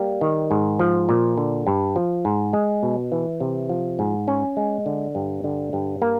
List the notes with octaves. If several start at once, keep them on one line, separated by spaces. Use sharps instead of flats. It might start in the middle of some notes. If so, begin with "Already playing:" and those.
Already playing: G3 A#3
D#3
G#2
F3
A#2
D3
G2
F3
G#2
G#3
B2
E3
C3
F3
G#2
C#4
G#3
D3
G2
D3
G2
A#3